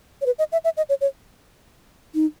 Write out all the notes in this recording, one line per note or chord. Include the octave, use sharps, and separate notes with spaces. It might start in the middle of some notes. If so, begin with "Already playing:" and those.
C#5
B4
D#5
E5
E5
D#5
C#5
C#5
D#4